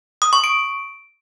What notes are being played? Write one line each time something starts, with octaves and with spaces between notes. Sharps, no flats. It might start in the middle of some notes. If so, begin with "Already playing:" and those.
D#6
C#6
D7